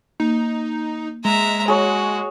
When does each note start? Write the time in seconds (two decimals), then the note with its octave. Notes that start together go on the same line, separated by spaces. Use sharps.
0.20 A#3 D#4
1.25 G#3 E5 A#5
1.68 F#4 G#4 C#5